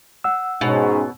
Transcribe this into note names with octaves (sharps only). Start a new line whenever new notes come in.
F#5 E6
G#2 B2 C#4